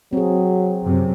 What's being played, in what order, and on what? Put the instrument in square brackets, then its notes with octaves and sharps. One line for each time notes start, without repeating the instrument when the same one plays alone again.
[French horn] F#3 [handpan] C4 G#4
[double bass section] F#2 C3